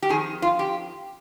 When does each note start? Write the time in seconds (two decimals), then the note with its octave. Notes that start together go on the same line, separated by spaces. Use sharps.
0.02 G4
0.09 F2 D#3 G#4
0.42 F4
0.59 G4